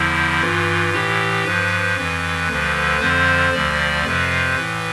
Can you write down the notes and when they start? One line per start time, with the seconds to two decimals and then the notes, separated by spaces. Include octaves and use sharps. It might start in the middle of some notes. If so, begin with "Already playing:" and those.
Already playing: E2 D3 F3 E4
0.41 G2 E3 F4
0.93 A2 E3 G4
1.45 G2 F3 B4
1.97 F2 E3
2.49 D2 D3 F3
3.00 F2 D3 F3 C5
3.52 D2 D3 F3 D5
4.04 F2 C3 F3 B4
4.56 A2 E3